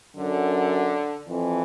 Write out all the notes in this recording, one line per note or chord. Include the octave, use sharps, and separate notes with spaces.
F#2 D3
F2 E3